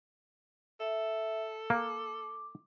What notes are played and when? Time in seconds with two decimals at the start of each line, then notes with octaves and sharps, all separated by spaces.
0.80 A4 E5
1.70 A#3 D6